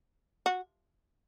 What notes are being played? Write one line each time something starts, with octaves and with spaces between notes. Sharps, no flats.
F#4